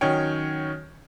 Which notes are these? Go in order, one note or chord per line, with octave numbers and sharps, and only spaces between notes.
D#3 F#3 C#4 C#5 G5